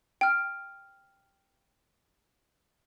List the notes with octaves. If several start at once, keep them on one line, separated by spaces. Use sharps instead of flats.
G5 F6